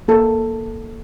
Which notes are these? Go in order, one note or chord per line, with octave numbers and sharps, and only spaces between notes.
A#3 A4
A#3